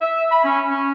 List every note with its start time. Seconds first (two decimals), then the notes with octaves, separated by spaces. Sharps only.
0.01 E5
0.30 B5
0.43 C#4
0.69 C#4